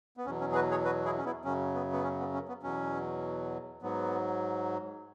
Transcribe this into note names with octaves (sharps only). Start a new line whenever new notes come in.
B3
E2 B2 F#3 C#4
C#4
G#4
F#4 B4
G#4 C#5
F#4 B4
E4 G#4
C#4
B3 E4
F#2 C#3 F#3 C#4
B3
B3
C#4
B3
C#4
B3
E2 B2 F#3 C#4
G#2 F#3 B3